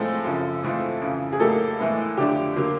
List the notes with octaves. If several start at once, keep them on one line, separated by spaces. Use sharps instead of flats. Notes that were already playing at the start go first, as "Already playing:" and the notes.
Already playing: A2 F3 G#3 C4 F4 A4
F#2 C#3 F3
G#2 E3 A3 C4 F4
F2 C#3 E3
G#4
A2 F#3 A#3 D#4 G4 A4
A2 E3 G#3 B3 E4
F2 D3 F#3 A3 D4 G4
D3 F#3 A#3